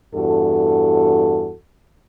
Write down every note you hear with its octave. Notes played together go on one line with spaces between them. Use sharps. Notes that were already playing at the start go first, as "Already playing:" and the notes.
E2 G2 F#4 A4